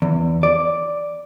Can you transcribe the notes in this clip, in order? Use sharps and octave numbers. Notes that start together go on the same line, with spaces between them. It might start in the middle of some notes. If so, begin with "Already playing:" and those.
E2
D5